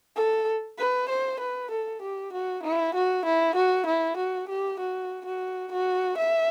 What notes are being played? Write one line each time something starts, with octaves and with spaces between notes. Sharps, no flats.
A4
B4
C5
B4
A4
G4
F#4
E4
F#4
E4
F#4
E4
F#4
G4
F#4
F#4
F#4
E5